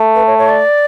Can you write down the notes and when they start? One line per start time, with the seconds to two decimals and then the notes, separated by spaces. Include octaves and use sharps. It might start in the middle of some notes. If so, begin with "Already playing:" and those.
Already playing: A3
0.15 B4
0.27 C#5
0.38 C#5
0.49 D5